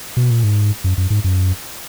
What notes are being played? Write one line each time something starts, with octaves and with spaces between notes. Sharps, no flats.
B2
A#2
G#2
F#2
F#2
G#2
F#2